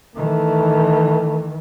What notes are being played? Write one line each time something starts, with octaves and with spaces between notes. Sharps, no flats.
D#3 E3 A3